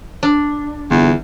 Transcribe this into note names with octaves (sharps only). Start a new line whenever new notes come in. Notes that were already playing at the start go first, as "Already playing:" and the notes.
D4
G1 E2